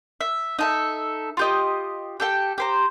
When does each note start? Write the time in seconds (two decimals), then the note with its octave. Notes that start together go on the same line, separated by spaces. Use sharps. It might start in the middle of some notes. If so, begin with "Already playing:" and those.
0.21 E5
0.59 D#4 A4 E5
1.37 F4 G4 D#5
2.20 G4 A4 G5
2.58 G4 C5 A#5